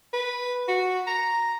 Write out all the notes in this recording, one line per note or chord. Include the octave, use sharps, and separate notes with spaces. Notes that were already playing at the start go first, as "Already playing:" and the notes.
B4
F#4
A#5